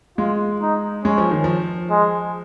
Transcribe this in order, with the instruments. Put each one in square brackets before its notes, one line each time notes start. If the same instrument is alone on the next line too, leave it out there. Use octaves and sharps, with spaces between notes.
[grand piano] G#3 [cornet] F4
[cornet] D#4
[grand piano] G#3 [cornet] C#4
[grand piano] F3
D#3
F3
[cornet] G#3